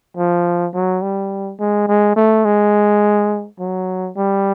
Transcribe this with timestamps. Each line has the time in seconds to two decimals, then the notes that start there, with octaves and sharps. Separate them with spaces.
0.17 F3
0.74 F#3
1.02 G3
1.59 G#3
1.88 G#3
2.16 A3
2.45 G#3
3.59 F#3
4.16 G3